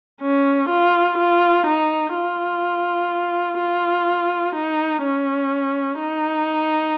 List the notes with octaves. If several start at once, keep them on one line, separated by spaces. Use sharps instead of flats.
C#4
F4
F4
D#4
F4
F4
D#4
C#4
D#4